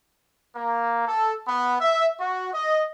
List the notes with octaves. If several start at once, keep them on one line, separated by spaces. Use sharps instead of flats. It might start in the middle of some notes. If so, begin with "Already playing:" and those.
A#3
A4
B3
E5
F#4
D#5